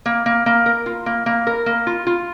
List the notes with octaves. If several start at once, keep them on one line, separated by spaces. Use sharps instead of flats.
A#3
A#3
A#3
A#4
F4
A#3
A#3
A#4
A#3
F4
F4